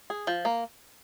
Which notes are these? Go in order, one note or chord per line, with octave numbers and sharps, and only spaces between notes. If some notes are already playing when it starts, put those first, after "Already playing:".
G#4
F3
A#3